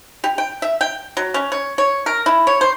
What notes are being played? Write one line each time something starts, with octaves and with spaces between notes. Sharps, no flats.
G4
G5
E5
G5
F#3
C#4
C#5
C#5
A#4
E4
C#5
C5